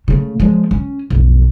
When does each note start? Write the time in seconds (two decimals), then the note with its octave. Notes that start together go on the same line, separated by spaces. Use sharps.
0.08 C#3 A3
0.40 F3 G#3
0.71 C#4
1.10 B1 F2